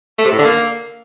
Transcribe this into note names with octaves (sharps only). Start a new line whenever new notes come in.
A3
C3
A2
D3
A#3